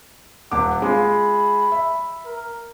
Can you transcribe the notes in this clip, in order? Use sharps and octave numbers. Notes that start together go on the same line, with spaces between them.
D#1 F#5 D6
G#3 F4 B5
E5
A#4